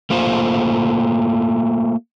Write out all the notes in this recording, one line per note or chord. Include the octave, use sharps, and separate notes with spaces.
A3 A#3 F4 C5